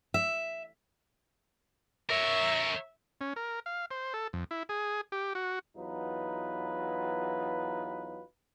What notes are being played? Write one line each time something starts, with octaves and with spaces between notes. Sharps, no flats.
E5
A#4 C#5 E5
C#4
A#4
F5
C5
A4
F2
E4
G#4
G4
F#4
E2 F#3 D#4 F4 B4